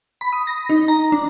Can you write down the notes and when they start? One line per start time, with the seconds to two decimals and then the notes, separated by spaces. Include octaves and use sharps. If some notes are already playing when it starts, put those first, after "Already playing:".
0.21 B5
0.33 D#6
0.47 A#6
0.69 D#4
0.88 A#5
1.12 D4